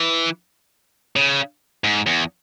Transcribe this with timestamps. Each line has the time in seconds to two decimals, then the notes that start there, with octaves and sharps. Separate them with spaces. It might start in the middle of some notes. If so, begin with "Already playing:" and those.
Already playing: E3
1.16 C#3
1.84 G#2
2.06 E2